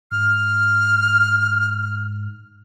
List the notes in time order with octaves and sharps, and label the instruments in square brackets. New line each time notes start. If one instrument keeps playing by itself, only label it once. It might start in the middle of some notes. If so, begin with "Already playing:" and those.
[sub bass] G#2 [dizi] F6